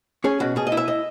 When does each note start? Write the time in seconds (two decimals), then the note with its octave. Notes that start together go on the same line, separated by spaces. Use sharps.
0.24 C#4 G#4
0.40 B2 F#4
0.56 B2 G#4
0.67 D#5
0.72 E4
0.77 E5
0.88 D#5